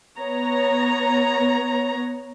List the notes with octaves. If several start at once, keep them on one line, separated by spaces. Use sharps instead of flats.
B3 C#5 A#5